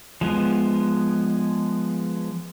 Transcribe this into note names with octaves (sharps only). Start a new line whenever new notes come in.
F3 G#3 B3